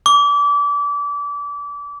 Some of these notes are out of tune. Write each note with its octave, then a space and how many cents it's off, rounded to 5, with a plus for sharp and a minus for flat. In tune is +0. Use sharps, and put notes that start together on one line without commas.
D6 -30